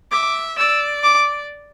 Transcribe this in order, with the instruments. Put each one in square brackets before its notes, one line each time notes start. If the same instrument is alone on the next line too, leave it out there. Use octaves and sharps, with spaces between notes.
[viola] E5 [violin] D6
[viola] D5 [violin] E6
[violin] D6